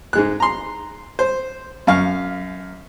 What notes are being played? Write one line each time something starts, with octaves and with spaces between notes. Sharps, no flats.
G#2 G#3 F#6
A#5 C6
C5
F#2 F5 C#6